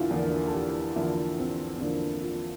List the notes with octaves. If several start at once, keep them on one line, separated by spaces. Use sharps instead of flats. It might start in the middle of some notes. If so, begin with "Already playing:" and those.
Already playing: E2 D3 A#3 D4 E4 F4
E2 D3 F3 A#3
A4
G4
E2 D3 F3 A#3 E4
C4
C4
E2 D3 F3 A#3 D4
F4